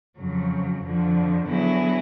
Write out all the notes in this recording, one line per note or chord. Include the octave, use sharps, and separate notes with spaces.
F2 C#3 F#3
F2 D3 F3
D3 F#3 B3 E4 G#4